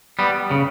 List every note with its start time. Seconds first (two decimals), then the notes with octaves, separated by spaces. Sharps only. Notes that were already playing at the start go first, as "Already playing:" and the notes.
0.19 G3 B3
0.51 C#3